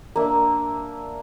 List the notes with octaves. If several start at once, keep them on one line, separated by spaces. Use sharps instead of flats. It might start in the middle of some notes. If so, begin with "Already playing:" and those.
A#3 D4 E5